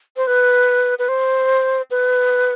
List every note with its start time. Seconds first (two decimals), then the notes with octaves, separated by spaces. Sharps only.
0.17 C5
0.27 B4
0.99 B4
1.09 C5
1.91 B4